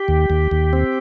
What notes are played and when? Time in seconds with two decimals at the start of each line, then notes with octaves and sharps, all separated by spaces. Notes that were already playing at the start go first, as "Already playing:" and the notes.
Already playing: G4
0.08 D#2
0.30 D#2
0.51 D#2
0.73 C4